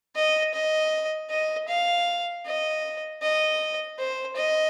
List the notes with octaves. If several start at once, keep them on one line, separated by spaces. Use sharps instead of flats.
D#5
D#5
D#5
F5
D#5
D#5
C5
D#5